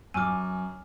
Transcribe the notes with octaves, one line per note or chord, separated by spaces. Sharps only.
F#2 G#5 D6 E6 F6